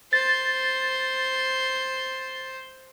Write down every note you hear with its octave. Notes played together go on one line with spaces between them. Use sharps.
C5 A6